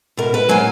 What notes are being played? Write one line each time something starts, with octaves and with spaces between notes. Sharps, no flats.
B2 A#4
B4
F#3 A#3 G#5